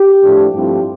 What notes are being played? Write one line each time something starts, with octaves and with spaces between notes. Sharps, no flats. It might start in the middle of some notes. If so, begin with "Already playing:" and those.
Already playing: G4
A2 F3 A3 D4
G2 F3 A3 C4 E4 G4